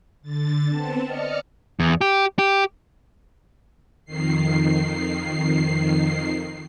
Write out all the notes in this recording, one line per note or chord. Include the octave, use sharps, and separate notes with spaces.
D3 A6
B3 C4 A5
D5 D#5 F6 C#7
E2
G4
G4
F2 D#3 C7